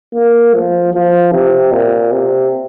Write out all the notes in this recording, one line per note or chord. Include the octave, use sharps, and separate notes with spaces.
A#3
F3
F3
C3
A#2
C3